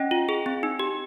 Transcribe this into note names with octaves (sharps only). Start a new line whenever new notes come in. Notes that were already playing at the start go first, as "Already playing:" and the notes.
Already playing: C#4 D#5 G5
F4
G#4
C4
D#4
G4